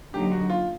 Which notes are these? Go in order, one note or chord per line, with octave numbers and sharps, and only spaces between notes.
D3 F#3 A#3 D#4 G4
F#4
F4